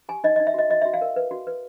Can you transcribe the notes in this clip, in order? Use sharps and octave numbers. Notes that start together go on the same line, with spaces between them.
G4 G#5
D#4 D#5
D#4 D#5
E5
F#4 D#5
F#4 D#5
F#4 E5
F5
A#4
B4
F#4
B4